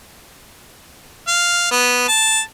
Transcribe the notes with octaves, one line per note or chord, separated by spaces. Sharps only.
F5
B3
A5